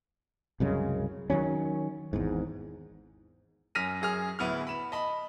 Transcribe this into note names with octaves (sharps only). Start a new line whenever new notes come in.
C2 F#2 C#3 G#3
D#3 E3 F#3 C#4
G#1 E2 G#2
F#2 F6 A#6 B6 D#7
F#2 G#4 F6
D1 B3 E4 F6
B5 E7
D#5 A5 B5